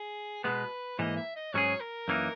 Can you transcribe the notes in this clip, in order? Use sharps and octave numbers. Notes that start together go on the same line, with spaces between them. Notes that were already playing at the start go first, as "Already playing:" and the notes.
Already playing: G#4
B2 G#3 B3 B4
G#2 E3 A#3 D#5
E5
D#5
G#2 F#3 C#4 G#4 C#5
A#4
F#2 E3 A#3 D#4